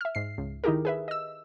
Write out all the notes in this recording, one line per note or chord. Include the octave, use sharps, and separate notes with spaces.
E5 F6
G#2 C7
C#2
D#3 D#4 E4 G4 G#4 A#4
G#4 B4 E5
D#5 E6